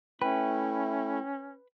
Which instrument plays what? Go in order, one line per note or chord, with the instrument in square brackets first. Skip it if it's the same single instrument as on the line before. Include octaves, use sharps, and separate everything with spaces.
[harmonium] A3 E4 [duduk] C#4 [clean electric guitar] B4 [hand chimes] G5